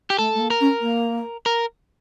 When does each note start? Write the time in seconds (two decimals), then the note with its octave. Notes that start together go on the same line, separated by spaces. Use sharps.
0.10 G4
0.18 A3 A4
0.35 A3
0.40 A#3
0.50 A#4
0.61 C#4
0.82 A#3
1.46 A#4